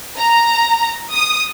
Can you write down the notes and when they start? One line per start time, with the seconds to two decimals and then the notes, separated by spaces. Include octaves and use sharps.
0.18 A#5
1.12 D#6